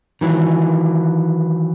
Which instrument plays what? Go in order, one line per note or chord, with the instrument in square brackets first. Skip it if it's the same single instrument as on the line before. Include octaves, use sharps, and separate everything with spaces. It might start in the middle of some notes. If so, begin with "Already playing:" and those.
[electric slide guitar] D#3 E3 F#3